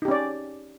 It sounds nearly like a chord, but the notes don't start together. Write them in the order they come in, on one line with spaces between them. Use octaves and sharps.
D#4 G4 C#4 D5